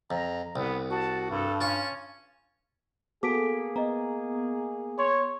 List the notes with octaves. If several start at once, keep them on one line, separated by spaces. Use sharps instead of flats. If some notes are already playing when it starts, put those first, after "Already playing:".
F2 A#5
C2 B3
F#4 A5
G2 A4
C#4 F4 C#6
A#3 B3 F#4 G#4 A4 D6 B6 D7
B3 D#5 A#5
C#5 C6